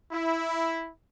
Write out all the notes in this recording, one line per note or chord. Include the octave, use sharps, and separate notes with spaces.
E4